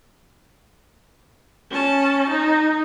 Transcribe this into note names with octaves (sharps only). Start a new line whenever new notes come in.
C#4 A5
D#4